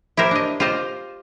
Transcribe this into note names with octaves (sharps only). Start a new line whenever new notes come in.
E4 G4 A#4 C5
D4 D#5
F4 G4 C5 D#5